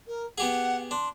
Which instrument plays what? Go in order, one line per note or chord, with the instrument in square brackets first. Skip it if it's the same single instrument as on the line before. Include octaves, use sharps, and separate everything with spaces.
[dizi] A#4
[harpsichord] B3 G4 G#4 [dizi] F#5
[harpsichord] D4 [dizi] C6